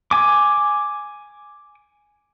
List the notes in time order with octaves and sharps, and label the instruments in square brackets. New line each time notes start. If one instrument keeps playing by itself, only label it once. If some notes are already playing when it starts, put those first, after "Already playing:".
[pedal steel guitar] G#5 D6